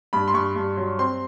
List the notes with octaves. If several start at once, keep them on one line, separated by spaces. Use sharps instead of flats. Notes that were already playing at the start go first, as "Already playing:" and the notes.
G2 B5
C6
G2 C#6
G2
F#3
C4 C6